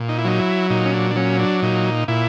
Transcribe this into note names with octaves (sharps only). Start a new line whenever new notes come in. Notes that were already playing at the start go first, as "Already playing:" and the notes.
Already playing: A#2
D#4
E4
F#3 D#4
E4
A#2 D#4
C#4
D4
D4
F#3 C#4
D4
A#2 D#4
A#2 E4